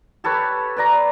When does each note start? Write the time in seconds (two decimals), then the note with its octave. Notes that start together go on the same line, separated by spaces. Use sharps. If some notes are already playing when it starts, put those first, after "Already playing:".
0.24 G4 A4 B4 C#5
0.77 B4 D5 A#5